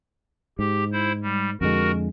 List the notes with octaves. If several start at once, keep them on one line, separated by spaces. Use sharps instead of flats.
G#2 G4
E4 C5
G3
F2 D3 G#3 F#4 A#4